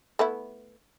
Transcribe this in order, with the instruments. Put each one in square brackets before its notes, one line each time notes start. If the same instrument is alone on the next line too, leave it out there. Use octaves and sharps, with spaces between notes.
[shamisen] A3 B3 E4